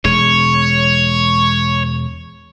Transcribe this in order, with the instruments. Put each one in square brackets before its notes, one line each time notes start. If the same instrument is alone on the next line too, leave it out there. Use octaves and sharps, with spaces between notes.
[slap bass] E1 G#3 [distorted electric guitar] C#5